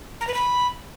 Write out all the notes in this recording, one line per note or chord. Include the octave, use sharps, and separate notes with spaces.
A#5
B4
B5